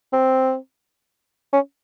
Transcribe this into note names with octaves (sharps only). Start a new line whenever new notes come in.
C4
C#4